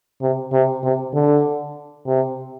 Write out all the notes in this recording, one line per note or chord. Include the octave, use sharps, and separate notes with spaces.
C3
C3
C3
D3
C3